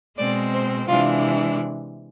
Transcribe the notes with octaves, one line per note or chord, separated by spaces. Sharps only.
B2 G#3 C4 D5
C5
C3 E3 G#3 D4 F4